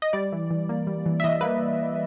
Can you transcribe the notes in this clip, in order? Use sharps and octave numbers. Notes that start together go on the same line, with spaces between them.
D#5
G3 D5
E3
E3
A#3
G3
E3
E5
E3 D#5
A#3 B4